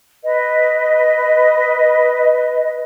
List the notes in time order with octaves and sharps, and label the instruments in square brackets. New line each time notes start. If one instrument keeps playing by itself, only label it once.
[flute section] B4 D#5